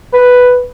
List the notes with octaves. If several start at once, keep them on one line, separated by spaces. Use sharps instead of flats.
B4